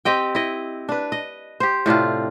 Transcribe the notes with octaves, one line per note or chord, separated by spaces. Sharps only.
C4 G4 D#5 G5
E4 D#5
D4 B4
D#5
G4 C5
A2 C3 D4 F4